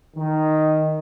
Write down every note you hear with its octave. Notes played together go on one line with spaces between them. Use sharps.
D#3